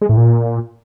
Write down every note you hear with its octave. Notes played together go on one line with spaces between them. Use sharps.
G#3
A2
A#2